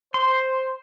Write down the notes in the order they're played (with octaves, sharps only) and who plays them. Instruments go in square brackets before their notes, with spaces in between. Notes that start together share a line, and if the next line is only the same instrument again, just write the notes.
[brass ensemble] C5 [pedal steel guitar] C6